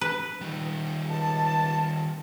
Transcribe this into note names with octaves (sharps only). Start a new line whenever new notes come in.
B4
D#3 G3
C#2 G4 A5